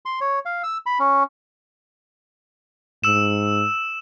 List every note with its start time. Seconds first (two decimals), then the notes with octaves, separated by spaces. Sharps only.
0.06 C6
0.21 C#5
0.45 F5
0.63 E6
0.86 B5
0.99 C#4
3.04 G#2 E6 E7